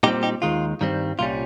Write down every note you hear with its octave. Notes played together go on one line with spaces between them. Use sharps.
A#2 G3 C4 D#4 G4
D#4 G4
D#2 D#3 G#3 F4
G2 D#3 G3 C4
C2 A#2 G3 C#4 F4